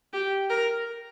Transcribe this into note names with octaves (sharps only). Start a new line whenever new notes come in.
G4
A#4